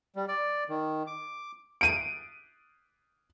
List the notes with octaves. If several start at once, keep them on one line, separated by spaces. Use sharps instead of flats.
G3
D5
D#3
D6
D7 D#7